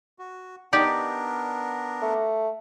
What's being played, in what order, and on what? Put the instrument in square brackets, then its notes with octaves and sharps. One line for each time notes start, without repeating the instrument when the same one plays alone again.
[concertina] F#4
[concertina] B3 D4 A#4 [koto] D#4 G4 D5
[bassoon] A3